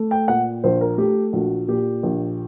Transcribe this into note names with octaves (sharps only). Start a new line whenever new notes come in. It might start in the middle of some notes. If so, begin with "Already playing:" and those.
Already playing: A3
G5
A#2 F#5
A#1 C5
A#4
A3 G4
A#1 F#4
A#2 G4
A#1